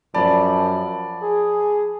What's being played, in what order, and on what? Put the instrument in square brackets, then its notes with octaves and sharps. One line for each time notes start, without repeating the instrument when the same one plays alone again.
[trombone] F#2 [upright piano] F3 D5 [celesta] A5 B5
[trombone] G#4